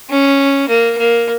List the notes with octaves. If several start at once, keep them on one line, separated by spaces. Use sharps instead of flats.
C#4
A#3
A#3